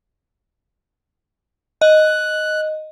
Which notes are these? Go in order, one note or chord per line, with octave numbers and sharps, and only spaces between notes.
D#5 F#6